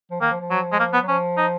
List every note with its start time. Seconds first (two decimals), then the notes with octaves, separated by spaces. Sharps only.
0.11 F3
0.20 D#3 A#3
0.31 F3
0.41 F3
0.50 F#3
0.72 G#3
0.79 A#3
0.93 B3
1.03 F#3
1.08 F3 C#4
1.37 D#4